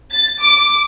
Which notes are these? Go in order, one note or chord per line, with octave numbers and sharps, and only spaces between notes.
A6
D6